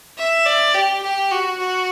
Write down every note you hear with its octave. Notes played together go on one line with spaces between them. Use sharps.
E5
D5
G4
G4
F#4
F#4